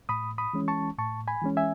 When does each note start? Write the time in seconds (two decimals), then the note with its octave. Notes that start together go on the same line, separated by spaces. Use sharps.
0.09 A2 B5 D#6
0.38 B5 D#6
0.53 E3 G#3 C#4
0.68 A5 C#6
0.98 A2 A5 C#6
1.28 G#5 B5
1.42 E3 G#3 C#4
1.57 E5 G#5